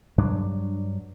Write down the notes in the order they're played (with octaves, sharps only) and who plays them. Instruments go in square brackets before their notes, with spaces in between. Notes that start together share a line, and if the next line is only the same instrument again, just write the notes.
[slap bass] G2 F#3 D4